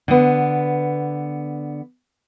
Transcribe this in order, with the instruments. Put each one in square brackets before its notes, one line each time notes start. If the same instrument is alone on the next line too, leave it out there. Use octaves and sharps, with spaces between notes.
[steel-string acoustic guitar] D3 B3